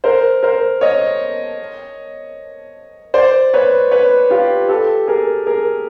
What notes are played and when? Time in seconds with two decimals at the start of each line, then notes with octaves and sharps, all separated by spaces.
0.04 A#4 C5
0.43 A#4 C5
0.81 C#5 D#5
3.14 C5 D5
3.54 B4 C#5
3.91 B4 C#5
4.30 F4 G4
4.69 G4 A4
5.07 G#4 A#4
5.47 G#4 A#4